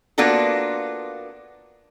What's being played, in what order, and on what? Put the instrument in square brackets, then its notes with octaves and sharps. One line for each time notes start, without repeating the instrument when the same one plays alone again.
[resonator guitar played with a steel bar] A#3 B3 D4 F4 F#4 A4